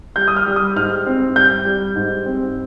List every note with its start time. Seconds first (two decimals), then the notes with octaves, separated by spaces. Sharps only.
0.16 G3 G6
0.28 D#6
0.36 F6
0.46 G3
0.56 D#6
0.76 G#2 F6
1.07 C4
1.36 G3 G6
1.65 G3
1.96 G#2
2.26 C4